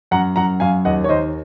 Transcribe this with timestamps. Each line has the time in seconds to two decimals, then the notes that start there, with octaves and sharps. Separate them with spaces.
0.11 F#2 F#5 A#5
0.36 F#2 F#5 A#5
0.60 F#2 F5 G#5
0.85 D#2 D#5 F#5
1.04 C#5
1.09 D#3 C5 D#5